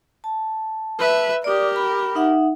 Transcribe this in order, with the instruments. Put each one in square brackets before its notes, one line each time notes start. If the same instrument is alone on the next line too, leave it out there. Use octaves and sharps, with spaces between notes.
[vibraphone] A5
[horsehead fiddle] B4 E5
[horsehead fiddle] G4 A#4 [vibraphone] D5 D6 D#6
[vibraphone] B5
D#4 E5 F#5